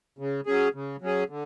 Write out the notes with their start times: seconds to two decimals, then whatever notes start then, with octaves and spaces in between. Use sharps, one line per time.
0.19 C#3
0.47 F#3 C#4 G#4
0.74 C#3
1.02 F#3 C#4 G#4
1.29 D3